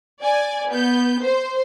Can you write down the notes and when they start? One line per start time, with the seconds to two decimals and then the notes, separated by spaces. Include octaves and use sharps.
0.22 D5 G#5
0.70 B3 G6
1.21 C5